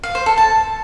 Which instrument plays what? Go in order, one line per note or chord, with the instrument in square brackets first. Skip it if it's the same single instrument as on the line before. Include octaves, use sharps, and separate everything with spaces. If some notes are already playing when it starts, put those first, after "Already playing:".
[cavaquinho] F5
C5
A4
A5